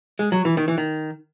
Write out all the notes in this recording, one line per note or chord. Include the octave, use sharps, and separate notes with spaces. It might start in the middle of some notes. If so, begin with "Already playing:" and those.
G#3
F#3
E3
D#3
E3
D#3